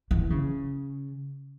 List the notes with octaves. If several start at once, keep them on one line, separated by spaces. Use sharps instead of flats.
E3
C#3